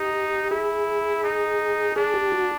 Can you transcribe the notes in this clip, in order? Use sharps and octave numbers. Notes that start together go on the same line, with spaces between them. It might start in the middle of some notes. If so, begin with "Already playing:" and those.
Already playing: D#4 G4
E4 G#4
D#4
D4 G#4
G4
F#4